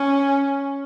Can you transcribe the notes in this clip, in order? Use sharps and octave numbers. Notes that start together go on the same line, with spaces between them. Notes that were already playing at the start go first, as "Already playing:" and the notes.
Already playing: C#4